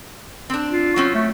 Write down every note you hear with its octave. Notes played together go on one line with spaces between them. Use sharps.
C4 D4
F4
F#3 C4 C#4
A3